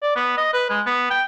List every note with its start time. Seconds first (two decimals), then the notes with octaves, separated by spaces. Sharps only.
0.03 D5
0.16 B3
0.37 D#5
0.53 B4
0.70 G#3
0.86 B3
1.10 G5